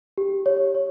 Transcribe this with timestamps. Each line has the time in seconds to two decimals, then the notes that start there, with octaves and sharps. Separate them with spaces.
0.18 G4
0.46 C#5
0.75 C#5